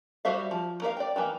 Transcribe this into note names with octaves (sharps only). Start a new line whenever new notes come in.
G3 F#4 C5 E5 F5
F3
A#3 A#4 B4 F5
D5 G5
D#3 E3 A3 A#3